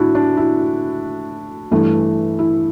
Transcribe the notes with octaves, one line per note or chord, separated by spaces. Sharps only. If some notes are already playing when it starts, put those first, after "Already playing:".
Already playing: A2 D4 E4 F#4
D4
E4
G2 E3 A3
E4